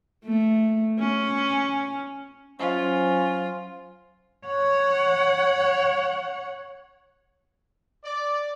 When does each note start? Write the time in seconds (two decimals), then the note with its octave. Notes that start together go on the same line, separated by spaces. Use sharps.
0.25 A3
0.99 C#4
2.59 F#3 C#4 F4 C5 G#5
4.47 C#5 F#5
8.04 D5